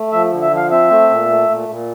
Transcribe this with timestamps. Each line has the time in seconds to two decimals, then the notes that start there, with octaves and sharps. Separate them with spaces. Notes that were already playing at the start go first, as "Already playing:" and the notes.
Already playing: A3
0.12 F3 E5
0.32 D3
0.42 E5
0.51 F3
0.57 F5
0.71 C4 E5
0.91 A3
1.10 A#2
1.29 A3
1.49 A#2
1.69 A#2